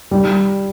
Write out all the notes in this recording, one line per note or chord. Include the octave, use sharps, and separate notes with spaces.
G3